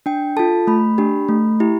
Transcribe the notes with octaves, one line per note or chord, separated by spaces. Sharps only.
D4 G5
F4 A4 A5
A3 B5
D4 G4
A3
E4 G4